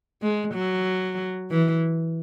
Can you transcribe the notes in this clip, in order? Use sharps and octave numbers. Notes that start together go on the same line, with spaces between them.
G#3
F#3
E3